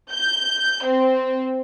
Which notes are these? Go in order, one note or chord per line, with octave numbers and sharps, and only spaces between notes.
G6
C4